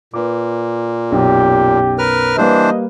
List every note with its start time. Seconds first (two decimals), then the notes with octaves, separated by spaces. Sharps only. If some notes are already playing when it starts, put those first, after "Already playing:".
0.14 A#2 B4 D6
1.12 B1 F#2 G4 C#5
1.98 A#4 B4 F6
2.38 E3 G3 A#3 D4 B4 C5 D#5